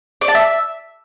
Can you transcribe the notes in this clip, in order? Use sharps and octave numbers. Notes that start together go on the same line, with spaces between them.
D5
A5
E5